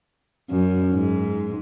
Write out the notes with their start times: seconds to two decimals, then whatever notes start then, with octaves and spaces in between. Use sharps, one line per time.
0.50 F#2
0.93 G#2